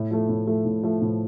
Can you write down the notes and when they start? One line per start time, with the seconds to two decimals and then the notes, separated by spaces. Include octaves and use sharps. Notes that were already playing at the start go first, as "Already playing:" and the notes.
Already playing: A2
0.11 F3 A3
0.29 A2
0.47 F3 A3
0.65 A2
0.83 F3 A3
1.02 A2